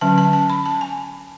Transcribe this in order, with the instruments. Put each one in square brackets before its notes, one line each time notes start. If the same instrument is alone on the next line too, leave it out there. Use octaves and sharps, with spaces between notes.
[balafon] D3 F#3 C#4 A5
A5
A5
B5
A5
G#5